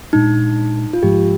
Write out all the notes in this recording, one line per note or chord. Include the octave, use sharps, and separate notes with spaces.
A#2 G#3 D4 D#4
F4
G#2 F3 G#3 G4